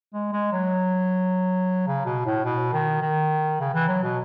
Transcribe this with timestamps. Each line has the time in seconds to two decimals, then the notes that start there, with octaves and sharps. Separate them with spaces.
0.14 G#3
0.33 G#3
0.53 F#3
1.87 C#3
2.06 B2
2.26 A2
2.45 B2
2.73 D#3
3.02 D#3
3.60 C#3
3.74 E3
3.88 F#3
4.04 B2